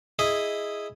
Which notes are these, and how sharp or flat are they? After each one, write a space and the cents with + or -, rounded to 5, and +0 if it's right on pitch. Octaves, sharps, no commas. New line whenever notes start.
E4 +0 G#4 +0 D#5 +0